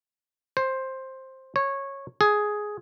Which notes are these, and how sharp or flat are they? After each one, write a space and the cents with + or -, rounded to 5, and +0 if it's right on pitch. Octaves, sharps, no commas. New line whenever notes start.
C5 +10
C#5 -15
G#4 +5